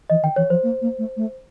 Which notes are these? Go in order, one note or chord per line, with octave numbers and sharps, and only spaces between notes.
E3 D#5
D#3 G5
E3 C#5
F3 C5
A#3
A#3
A3
A3